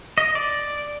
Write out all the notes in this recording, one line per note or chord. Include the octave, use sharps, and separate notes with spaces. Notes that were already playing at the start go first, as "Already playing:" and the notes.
D#5
D5